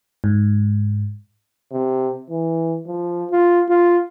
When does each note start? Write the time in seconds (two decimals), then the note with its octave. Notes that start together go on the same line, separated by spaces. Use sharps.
0.24 G#2
1.72 C3
2.30 E3
2.87 F3
3.31 F4
3.69 F4